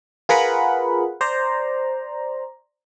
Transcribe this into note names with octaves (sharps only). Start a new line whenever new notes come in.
F4 G#4 A#4 B4 F#5 B5
C5 D5 A#5